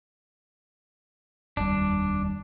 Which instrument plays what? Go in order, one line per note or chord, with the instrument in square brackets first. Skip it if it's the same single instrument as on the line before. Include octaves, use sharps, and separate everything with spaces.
[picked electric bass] F1 D#2 G3 [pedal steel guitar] D4